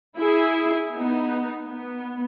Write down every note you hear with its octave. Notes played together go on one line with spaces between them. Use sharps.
E4 G#4
B3 D#4
B3